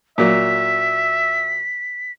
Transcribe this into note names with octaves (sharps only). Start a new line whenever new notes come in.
A#2 F#3 E5 B6